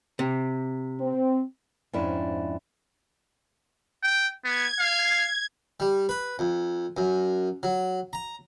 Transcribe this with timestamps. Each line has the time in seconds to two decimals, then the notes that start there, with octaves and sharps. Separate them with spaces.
0.19 C3
1.00 C4
1.93 F2 G#2 C#4 D4 E4
4.03 G5
4.44 B3 G#6
4.79 F5
5.80 G3
6.09 B4
6.39 F2
6.97 F#2
7.63 F#3
8.13 A#5